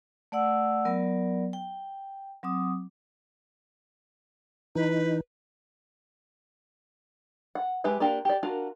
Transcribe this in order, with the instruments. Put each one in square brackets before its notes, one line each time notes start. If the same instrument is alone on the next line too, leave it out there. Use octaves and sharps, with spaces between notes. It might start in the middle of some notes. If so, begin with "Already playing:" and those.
[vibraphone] A3 D5 F#5 E6
F#3 B3 A#4 D5
G5
F#3 C4 D6 D#6
[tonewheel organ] E3 D#4 [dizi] B4
[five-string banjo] F#5
G#3 G4 B4 E5
A#3 D4 F4 G4 A#4
G4 D5
D4 F4 F#4 A#4